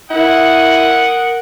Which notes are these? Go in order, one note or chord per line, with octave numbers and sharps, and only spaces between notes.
E4 A#4 F#5 D#6